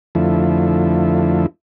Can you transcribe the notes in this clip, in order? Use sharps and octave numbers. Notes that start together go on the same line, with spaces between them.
F2 D3 F3 A3 E4